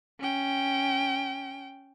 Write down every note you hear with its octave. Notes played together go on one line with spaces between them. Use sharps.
C#4 G5